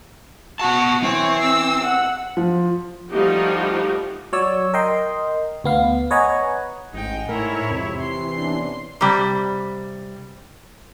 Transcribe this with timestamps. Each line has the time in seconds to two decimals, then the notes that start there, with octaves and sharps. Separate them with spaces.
0.60 B2 F#4 A5
1.03 E3 C4 C#5
1.42 E6
1.83 F#5
2.37 F3
3.10 F3 G3 A3 D#4 F#4 G4
4.33 F#3 C#5 D5 E6
4.74 A#4 D#5 G5 C6
5.64 D2 B3 F5
6.11 B4 C#5 D#5 F#5 G#5 A#5
6.94 A1 G#2 D#4 G5
7.29 A2 E4 A#4 C#5
7.70 F2 C3
8.01 E3 C6
8.37 B3 C#4 D4
9.01 C3 G3